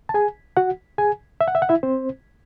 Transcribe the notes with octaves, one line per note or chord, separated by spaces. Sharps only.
A5
G#4 G#5
F#4 F#5
G#4 G#5
E5
F#5
E5
F#5
E4 E5
C4 C5